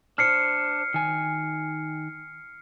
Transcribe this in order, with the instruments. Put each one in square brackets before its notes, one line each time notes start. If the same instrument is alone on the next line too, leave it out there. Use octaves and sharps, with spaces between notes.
[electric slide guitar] D4 C5 [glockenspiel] F6 C7 C#7
[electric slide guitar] D#3 G#5